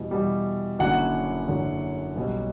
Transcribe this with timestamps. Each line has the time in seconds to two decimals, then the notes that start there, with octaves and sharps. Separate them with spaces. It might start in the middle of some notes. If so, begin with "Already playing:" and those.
Already playing: E2 B2 G3
0.11 E2 B2 G3
0.79 F#1 F#2 D3 F#3 F#5
1.48 F#1 F#2 D3 F#3
2.16 B1 B2 G3